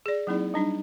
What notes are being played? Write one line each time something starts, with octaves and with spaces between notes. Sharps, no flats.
G#4 D5
F#3 A#3 C4 D#4 E4 G#4
G3 D4 D#4